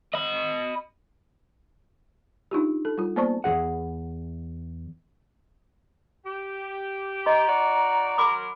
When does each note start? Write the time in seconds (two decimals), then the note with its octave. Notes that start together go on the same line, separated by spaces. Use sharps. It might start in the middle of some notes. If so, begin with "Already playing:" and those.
0.14 D#5 B5
2.51 D4 D#4 F4 G4
2.85 A4
2.98 G3 F4
3.16 A#3 B3 C5 D5 A5 C#6
3.44 E2 E3 G#4 F#5
6.25 G4
7.26 D#5 A#5 C6
7.47 D#4 F#4 D5
8.18 F#3 A#4 B5 C6 D6